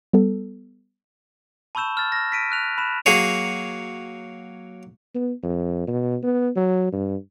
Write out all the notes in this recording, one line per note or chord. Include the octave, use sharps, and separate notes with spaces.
G3 B3 A4
A5 B5 C#6 E6 G6 E7
F6 A6
F6 A#6
B6 D7 D#7
F6 F#6 F7
B5 F#6 E7
F#3 A#3 G#4 C#5
B3
F2
B2
B3
F#3
G2